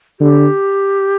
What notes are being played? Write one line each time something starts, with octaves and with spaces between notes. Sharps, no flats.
D3 G4